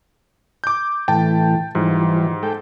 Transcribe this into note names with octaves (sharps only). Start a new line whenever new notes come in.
D6 G6
A2 E3 G5 A5
G#2 E3 F3 G3
G#3 A4 G5